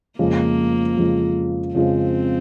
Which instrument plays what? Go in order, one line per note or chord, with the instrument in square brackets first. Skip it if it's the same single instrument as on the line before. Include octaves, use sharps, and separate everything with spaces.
[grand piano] F2 C#3 F3 G#3 [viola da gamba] A#3
[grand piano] F2 C#3 F3 G#3
[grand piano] F2 C#3 F3 G#3 [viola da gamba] C4